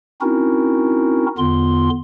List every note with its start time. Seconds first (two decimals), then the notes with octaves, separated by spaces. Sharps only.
0.21 C4 C#4 D#4 E4 F#4 A#4
1.38 E2 D3 B3 F4 C6